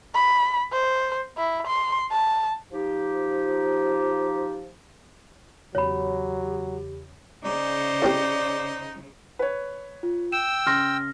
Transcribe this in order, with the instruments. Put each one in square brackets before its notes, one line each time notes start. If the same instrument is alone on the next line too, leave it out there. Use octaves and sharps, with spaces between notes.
[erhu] B5
C5
E4
C6
A5
[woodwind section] F3 D#4 G4
[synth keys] E2 C#3 [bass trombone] F#3 [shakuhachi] G4 [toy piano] C#5 B5
[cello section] C#3 [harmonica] D#4 C5 [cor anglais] D5
[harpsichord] A2 C4 G4
[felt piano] B4 C#5
[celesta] F4
[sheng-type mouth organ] G5 E6 [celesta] E7
[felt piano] C#3 C6 [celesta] F6 A#6